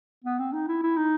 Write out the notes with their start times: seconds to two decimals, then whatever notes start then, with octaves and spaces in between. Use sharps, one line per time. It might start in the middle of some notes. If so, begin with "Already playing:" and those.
0.24 B3
0.39 C4
0.53 D#4
0.68 E4
0.83 E4
0.97 D#4